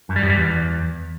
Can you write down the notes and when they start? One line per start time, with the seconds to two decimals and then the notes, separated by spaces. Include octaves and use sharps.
0.09 F#2
0.16 G3
0.23 F#2
0.30 G3
0.36 E2